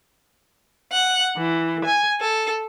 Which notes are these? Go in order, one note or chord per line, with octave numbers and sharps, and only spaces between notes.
F#5
E3
G#5
A4